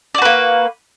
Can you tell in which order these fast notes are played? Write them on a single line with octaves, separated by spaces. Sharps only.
D5 F#4 B4 A#3